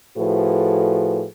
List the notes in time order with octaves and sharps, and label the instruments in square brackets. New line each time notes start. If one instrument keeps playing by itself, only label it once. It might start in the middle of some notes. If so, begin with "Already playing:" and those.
[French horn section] A2 F3 F#4 G#4 A4 B4